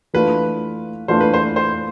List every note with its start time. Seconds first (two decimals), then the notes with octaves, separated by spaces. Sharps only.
0.14 E3 A3 D4 F4 B4
1.08 E3 A3 D4 F4 C5
1.21 B4
1.34 C5
1.56 C5